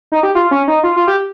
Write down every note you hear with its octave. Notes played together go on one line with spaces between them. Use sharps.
D#4
G4
F4
C#4
D#4
F4
F4
G4